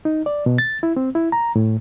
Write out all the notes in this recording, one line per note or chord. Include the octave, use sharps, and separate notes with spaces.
D#4
D5
B2
A6
E4
C4
E4
A#5
A2